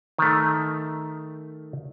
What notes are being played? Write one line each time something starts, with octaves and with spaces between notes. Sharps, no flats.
D#3 A3